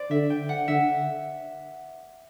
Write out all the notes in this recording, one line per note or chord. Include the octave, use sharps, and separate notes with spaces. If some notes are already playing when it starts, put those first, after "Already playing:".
Already playing: C5 D5
D3 E5
G5
F#5
D3 E5